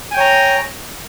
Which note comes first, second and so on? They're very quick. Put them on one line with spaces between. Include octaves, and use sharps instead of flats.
G#5 G5 C#5 A#5